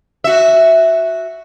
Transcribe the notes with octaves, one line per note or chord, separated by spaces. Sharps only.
F#4 E5